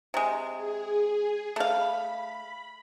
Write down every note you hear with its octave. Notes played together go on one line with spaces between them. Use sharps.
C3 G#3
G#4
A3 F5 B5